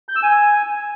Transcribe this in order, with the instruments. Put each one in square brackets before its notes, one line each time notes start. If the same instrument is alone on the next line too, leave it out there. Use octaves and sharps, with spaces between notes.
[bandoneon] G6
E6
G#5